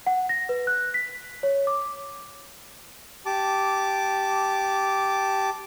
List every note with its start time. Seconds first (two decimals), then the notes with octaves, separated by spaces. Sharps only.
0.06 F#5
0.29 A#6
0.49 B4
0.67 F#6
0.94 B6
1.43 C#5
1.67 D6
3.26 G4 A5 D6